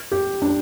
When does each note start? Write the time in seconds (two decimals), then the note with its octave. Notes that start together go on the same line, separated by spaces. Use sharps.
0.12 G4
0.42 D4